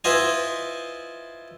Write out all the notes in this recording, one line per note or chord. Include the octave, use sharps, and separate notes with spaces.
E4 F4 B4 C5 D#5 G#5